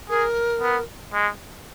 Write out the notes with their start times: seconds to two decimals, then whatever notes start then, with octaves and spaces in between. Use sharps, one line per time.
0.10 G#4 A#4
0.61 B3
1.13 G#3